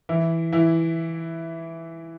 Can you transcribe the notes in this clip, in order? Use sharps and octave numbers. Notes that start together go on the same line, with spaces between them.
E3 E4
E3 E4